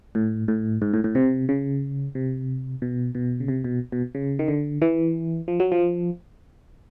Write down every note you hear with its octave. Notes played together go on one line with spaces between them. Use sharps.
A2
A2
G#2
A2
A2
C3
C#3
C3
B2
B2
C#3
C3
B2
B2
C#3
D#3
D3
E3
F3
F#3
F3